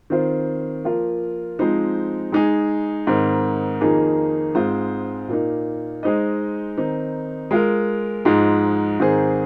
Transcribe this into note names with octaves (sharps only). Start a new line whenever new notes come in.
D#3 C4 F4 C5
F3 A#3 F4 A#4
F3 G#3 C4 D#4 C5
G#3 D#4 G#4
G#2 D#3 C4 D#4 A#4
F2 D#3 A#3 D#4 G#4
G#2 G#3 C4 F4 C5
A#2 A#3 D#4
G#3 D#4 C5 D#5
D#3 C4 D#4
G#3 F4 A#4
G#2 F3 G#3 D#4
G#2 D#3 C4 G#4 C5